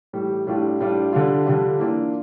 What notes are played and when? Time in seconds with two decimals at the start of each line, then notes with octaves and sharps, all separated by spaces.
0.13 A2 E3 G3
0.47 A2 G3 D4 F4
0.80 A2 G3 D4 F4
1.13 D3 G3 D4 F4
1.46 D3 G3 D4 F4
1.79 E3 A#3 D4 F4